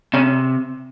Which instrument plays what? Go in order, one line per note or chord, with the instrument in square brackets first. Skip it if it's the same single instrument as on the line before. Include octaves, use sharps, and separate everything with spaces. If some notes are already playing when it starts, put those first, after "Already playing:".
[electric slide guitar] C3 C#4